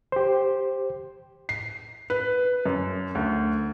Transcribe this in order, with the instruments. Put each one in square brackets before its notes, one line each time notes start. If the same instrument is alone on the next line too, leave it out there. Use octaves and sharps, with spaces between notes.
[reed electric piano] G4 C5
[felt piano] C7
B4
F#2
D2